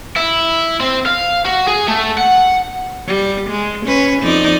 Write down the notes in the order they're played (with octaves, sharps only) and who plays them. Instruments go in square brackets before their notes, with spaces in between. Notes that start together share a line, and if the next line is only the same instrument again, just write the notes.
[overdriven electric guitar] E4
C4
F5
F#4
G#4
A3
F#5
[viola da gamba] G3
G#3
C#4 B4
F2 D#4 D5